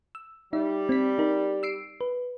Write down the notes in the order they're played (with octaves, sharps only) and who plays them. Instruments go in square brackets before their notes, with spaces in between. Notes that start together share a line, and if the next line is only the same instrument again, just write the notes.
[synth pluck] E6
[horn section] G3 [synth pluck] D#4 E5
[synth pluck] C4 B6
D#4 A#4
E6 C7 D7
B4